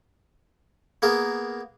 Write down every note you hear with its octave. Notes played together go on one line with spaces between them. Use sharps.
A#3 B3 G#4 A#4